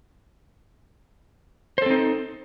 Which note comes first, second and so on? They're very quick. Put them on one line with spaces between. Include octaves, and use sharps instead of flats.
C5 A4 C4 D#4